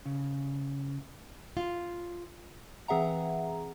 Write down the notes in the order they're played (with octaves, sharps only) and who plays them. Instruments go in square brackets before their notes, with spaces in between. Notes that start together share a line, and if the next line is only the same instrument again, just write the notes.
[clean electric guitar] C#3
[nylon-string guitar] F4
[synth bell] E3 C4 G#4 E5 F#5 A#5